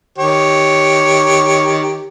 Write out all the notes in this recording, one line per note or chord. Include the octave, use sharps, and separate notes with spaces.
D#3 G4 C#5